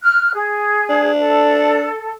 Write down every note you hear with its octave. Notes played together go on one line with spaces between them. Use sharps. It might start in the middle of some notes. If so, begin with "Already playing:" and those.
F6 F#6
G#4
D4
A4